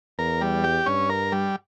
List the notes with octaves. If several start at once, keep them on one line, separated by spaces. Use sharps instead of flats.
E2 A#4
G3
G4
G2 C#4
A#4
G3